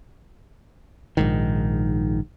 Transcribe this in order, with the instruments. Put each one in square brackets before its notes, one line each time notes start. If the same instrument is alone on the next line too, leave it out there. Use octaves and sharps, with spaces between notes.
[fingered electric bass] A#1 G#2 D#3